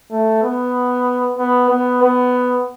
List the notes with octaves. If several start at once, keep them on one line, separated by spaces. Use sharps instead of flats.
A3
B3
B3
B3
B3